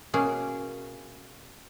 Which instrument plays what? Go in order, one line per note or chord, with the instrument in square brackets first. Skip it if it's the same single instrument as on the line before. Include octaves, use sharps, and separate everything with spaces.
[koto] B2 A#3 C#4 G#4